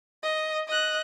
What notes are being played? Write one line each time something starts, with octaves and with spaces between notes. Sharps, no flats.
D#5
D#5 F#6